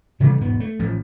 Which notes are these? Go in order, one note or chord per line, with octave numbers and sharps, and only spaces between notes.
C3 E3 G3 A3
E1 G#2 B3
A3
A1 F3